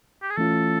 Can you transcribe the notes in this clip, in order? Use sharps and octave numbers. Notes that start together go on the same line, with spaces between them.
G4
G#4
E3 A3 C#4 F4 A4